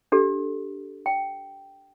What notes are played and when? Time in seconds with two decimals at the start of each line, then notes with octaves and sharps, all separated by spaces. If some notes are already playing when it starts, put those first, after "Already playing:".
0.12 D4 G4 A4
1.06 G5